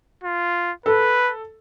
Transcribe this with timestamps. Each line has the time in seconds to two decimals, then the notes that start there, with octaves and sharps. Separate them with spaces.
0.24 F4
0.86 A4 B4